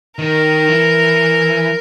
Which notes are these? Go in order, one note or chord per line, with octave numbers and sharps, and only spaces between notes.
D#3 A#4
E3